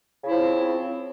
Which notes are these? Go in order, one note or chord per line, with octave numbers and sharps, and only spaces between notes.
C#3 F3 C4 E4